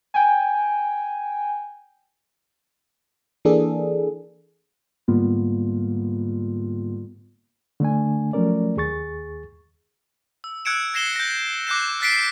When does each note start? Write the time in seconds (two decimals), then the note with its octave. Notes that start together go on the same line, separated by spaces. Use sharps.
0.14 G5 G#5
3.45 E3 A#3 D4 G#4 A4
5.08 G#2 D3 G3 A#3 B3 F4
7.80 D3 A3 D4 G#5
8.33 F3 F#3 A3 C#4 A#4 D5
8.77 D#2 G#4 C#6 A6
10.44 E6
10.65 E6 F#6 G#6 C#7 D7 E7
10.94 G#6 A#6 C7 E7 G7
11.16 G6 A#6
11.67 D6 F#6 G6 A#6 C7 E7
12.00 F6 F#6 A6 B6 C7 D7